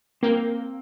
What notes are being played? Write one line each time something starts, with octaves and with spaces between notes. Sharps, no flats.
A#3 C4 G5